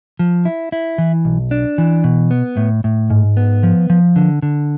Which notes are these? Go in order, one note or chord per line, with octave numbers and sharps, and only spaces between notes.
F3
E4
E4
E3
B1
D4
E3
B2
B3
A2
A2
G#2
B3
F3
F3
D3
D3